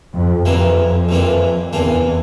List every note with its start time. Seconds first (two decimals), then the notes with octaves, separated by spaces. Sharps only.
0.13 F2
0.45 F2 C3 E3 A#3 D4
1.09 C3 E3 A#3 D4
1.73 E2 C3 E3 A#3 D4